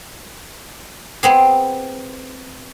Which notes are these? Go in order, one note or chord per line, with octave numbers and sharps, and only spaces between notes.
B3 C4 G#4